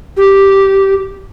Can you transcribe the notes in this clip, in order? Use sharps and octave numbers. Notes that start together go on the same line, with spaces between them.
G4